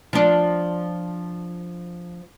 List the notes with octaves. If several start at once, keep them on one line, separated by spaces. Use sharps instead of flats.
F3 D4